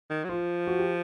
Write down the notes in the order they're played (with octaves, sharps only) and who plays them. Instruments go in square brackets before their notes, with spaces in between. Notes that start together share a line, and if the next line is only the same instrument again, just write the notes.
[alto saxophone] D#3
F#3
[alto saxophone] F3 [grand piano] F4
[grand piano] F#4
G4